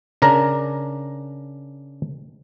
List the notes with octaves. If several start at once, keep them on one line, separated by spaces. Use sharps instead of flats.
C#3 D4 A#4 A#5